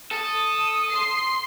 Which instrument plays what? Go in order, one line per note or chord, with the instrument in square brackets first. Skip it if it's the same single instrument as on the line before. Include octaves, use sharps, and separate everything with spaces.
[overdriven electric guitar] A4 [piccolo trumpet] D#6
[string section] C6 C7